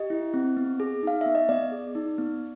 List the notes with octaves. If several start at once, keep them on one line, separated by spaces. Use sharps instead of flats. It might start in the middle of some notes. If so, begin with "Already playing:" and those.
Already playing: G4 D#5
E4
C4
B3
G#4
D#4 F5
B3 E5
D#5
B3 D5
G#4
D#4
B3